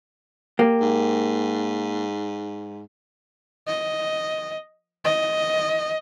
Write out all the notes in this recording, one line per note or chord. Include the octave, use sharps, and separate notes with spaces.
A#3 G4
G#2
D#5
D#5